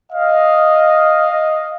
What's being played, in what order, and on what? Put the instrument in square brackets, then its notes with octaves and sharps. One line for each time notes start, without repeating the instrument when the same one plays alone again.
[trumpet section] D#5 F5